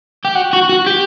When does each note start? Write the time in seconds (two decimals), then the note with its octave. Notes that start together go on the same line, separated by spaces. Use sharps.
0.25 G4
0.35 F#4
0.53 F#4
0.69 F#4
0.87 G4